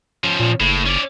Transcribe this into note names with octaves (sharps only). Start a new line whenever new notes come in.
F3 C#4
A#2
F#1 A2
C#4 D5